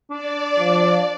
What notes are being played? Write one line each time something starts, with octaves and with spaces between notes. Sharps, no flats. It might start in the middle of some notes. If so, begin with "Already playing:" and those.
D4 D5
F3